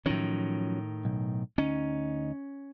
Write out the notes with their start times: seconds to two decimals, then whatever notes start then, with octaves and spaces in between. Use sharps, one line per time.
0.06 A2 D#3 F3 F#3 C#4
1.05 B1
1.58 D2 C#4 D#4